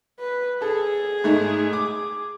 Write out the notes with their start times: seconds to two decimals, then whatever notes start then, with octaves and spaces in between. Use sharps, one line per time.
0.20 B4
0.62 G#4 A4
1.24 G#2 A3 D#4
1.73 D6